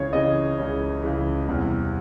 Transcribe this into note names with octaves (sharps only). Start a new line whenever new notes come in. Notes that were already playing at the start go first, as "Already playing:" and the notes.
Already playing: C#2 C#3 E3 C#5
C#2 C#3 E3 D#5
C#2 C#3 E3
C#2 C#3 E3
E2 C3 E3 G3